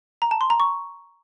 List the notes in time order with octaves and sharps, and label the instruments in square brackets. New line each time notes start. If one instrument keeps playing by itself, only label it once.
[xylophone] A#5
A5
C6
A#5
C#6